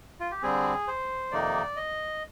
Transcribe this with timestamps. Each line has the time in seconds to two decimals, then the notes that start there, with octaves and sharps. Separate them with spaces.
0.20 F4
0.31 G4
0.42 D3 G3 C4 G#4
0.88 C5
1.31 F2 C3 D#3 A#3 D#4 D5
1.76 D#5